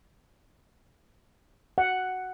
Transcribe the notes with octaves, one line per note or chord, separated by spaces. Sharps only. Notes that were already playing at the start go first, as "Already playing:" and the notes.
F#5